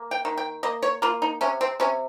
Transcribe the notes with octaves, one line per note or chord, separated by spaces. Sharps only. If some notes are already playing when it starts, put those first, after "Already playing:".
Already playing: A#3
G5
D#3
G5
A#3 D#5
C#5
A#3 F4
D#4
C3 C#4
C4
C3 C#4